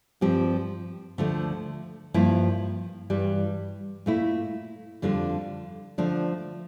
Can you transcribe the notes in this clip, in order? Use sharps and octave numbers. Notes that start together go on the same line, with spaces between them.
G2 F3 C4 G4
D2 D3 F3 A3
G2 F3 A#3 E4
G2 E3 G3
A#2 A3 E4
F2 D3 G3 D4 F4
D3 F3 A3 D4